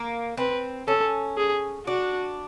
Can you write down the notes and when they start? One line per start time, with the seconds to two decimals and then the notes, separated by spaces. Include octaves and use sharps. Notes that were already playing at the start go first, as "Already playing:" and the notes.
Already playing: A#3
0.37 C4 B4
0.88 C#4 A4
1.37 G#4
1.87 D4 F#4